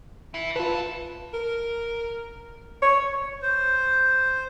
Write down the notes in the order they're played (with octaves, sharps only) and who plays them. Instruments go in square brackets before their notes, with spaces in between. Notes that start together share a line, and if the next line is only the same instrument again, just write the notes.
[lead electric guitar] E3 E4
[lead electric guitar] D3 A4 [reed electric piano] F4 B4
[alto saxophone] A#4
C#5
[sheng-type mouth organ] C5